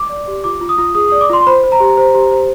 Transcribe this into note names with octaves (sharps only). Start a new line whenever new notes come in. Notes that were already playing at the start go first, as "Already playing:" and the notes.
Already playing: D6
D5
G4
F4 D6
F4
D#6
F4
G#4 D#6
D5 D#6
D6
F4 C6
C5 B5
C5
A#5
G4
C5
G4
C5